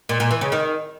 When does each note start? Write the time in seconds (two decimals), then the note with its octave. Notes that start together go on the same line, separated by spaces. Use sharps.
0.09 A#2
0.20 A#2
0.31 E3
0.41 C#3
0.52 D#3